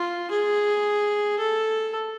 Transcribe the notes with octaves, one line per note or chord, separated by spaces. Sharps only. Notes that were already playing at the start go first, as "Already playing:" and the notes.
Already playing: F4
G#4
A4